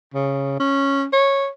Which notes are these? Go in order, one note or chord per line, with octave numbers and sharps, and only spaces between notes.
C#3
C#4
C#5